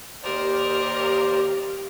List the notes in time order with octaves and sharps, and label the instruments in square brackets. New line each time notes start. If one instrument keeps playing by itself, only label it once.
[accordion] D#2 C5 D5 [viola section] G4 F5 [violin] A#4 D#5